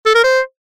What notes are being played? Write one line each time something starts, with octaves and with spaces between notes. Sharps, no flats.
A4
A#4
C5